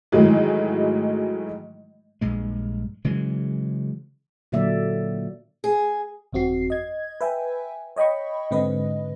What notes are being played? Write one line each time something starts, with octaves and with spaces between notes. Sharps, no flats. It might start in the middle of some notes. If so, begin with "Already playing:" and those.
G#2 D#3 E3 F#3 G#3 A3
A#1 G2 G#3
C#3 E3 F#3 G#3
A#2 D3 F#3 A#3 D5 E5
G#4
G1 F2 C4 F#4 C7
D#5 G#6
B4 E5 G5 G#5
C#5 D#5 G5 B5 C#6
G#2 D3 C4 B4 D#5